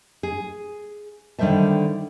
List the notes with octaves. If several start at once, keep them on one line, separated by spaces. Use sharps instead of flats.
G#4
D3 D#3 G3 C5 E5 A5